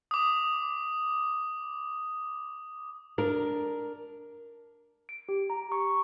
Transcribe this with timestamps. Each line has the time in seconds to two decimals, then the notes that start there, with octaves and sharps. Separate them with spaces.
0.11 D6 D#6
3.18 D4 A#4
5.09 D7
5.29 G4
5.50 A#5
5.72 C#6